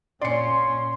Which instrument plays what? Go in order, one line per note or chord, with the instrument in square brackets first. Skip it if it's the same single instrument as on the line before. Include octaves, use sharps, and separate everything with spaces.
[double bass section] A#2 C#4 [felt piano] D5 C#7 [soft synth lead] C6